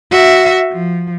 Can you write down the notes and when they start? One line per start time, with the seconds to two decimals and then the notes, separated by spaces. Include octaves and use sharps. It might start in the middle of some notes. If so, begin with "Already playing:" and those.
0.11 F#4 E5
0.72 F3